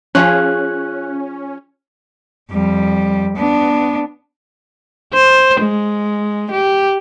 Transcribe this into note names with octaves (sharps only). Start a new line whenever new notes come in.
F3 C#4 F4 G#4 F#6
F2 G3
B3 D4
C5
G#3
G4